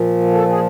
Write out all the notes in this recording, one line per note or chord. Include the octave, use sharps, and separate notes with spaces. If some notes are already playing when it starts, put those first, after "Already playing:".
Already playing: A#2 F3
A4
G#4